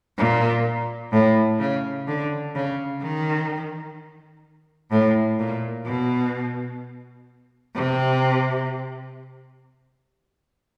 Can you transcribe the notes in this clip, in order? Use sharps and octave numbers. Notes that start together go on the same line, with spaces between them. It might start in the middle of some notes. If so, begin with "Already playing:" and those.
A#2
A2
C#3
D3
C#3
D#3
A2
A#2
B2
C3